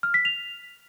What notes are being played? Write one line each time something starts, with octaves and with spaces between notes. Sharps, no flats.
F6
B6
F7